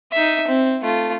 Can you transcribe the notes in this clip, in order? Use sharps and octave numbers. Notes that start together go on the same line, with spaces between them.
D#4 E5
C4
A3 F4